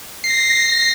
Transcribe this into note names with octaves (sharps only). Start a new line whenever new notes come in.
A#6 C7